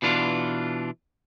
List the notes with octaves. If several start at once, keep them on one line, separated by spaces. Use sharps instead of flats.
B2 E3 D4 F4